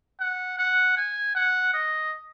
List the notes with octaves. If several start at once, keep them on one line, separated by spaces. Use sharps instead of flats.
F#5
F#5
G#5
F#5
D#5